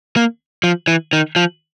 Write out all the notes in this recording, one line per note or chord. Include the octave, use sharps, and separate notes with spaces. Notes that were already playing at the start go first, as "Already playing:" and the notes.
A#3
F3
E3
D#3
F3